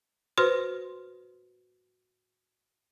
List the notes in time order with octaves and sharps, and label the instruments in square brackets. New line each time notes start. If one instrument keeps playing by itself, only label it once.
[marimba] F#4 B4 C5 C6 F6 A#6